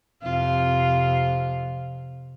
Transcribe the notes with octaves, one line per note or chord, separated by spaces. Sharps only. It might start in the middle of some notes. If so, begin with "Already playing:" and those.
F2 C3 F4